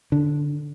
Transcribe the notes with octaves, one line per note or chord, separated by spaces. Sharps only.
D3